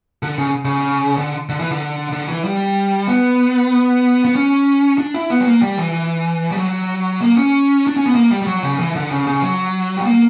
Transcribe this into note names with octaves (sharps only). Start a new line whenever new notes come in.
D3
C#3
C#3
D3
D3
E3
D3
D3
E3
G3
B3
B3
C#4
D4
E4
B3
G3
A#3
G3
E3
G3
F#3
A#3
C#4
D4
C#4
B3
A#3
G3
G3
F#3
C#3
E3
D3
C#3
C#3
F#3
G3
A#3